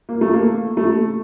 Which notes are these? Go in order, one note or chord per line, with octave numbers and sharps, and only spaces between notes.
A#3
A3
A#3
A3